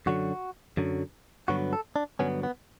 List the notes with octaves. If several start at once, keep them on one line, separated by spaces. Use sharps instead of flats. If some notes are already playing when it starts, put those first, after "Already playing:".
F#2 D3 F#3 F#4
F#2 D3 F#3
G2 D3 F#3 B3 F#4
A4
D4
G2 D3 F#3 B3 C#4
B3